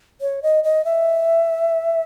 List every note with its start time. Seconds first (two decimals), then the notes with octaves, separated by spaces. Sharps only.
0.21 C#5
0.43 D#5
0.64 D#5
0.85 E5